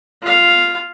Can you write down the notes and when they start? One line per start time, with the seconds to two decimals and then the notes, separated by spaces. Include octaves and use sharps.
0.23 F4 F5